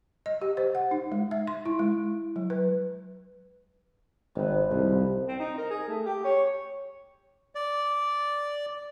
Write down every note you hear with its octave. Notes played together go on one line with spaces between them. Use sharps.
D#5
G4
C5
F#5
D#4
G#3
E5
C6
E4
G#3
F#3
B4
G#1 C3 D#4 B4
C2 F3
C4
D#4
A#4
G#4
A3
G4
C#5
D5